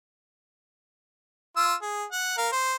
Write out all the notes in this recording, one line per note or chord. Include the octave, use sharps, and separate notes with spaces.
F4 E6
G#4
F#5
A#4 F5
C5